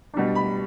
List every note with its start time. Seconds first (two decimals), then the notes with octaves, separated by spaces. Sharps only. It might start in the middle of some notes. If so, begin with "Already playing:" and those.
0.14 B2 G3 D4
0.35 B5